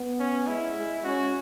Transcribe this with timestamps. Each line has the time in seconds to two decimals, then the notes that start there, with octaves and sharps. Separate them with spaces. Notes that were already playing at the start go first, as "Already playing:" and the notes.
Already playing: B3
0.20 C#4
0.47 G#3 E4
0.76 G#3
1.04 C#4 F#4